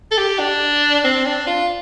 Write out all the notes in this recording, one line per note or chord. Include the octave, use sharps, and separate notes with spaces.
A4
G4
D4
C4
D4
F4